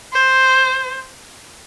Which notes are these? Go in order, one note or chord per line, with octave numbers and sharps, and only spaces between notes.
C5